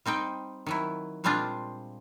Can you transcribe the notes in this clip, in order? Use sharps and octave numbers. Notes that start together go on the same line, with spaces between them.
G3 C4 D#4 G5
D#3 F#3 E4
A#2 G3 G#3 C4 D4 F4